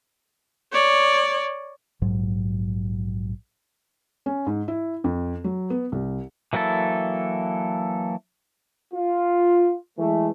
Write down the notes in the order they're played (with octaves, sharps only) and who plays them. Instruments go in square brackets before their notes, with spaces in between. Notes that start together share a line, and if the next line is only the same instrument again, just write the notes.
[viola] C#5 D5
[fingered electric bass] A#1 G#2 F#3
[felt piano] C#4
G#2
E4
F2
F#3
B3
C2
[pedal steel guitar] E3 F#3 A#3 E4 A4
[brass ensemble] F4
E3 G#3 A3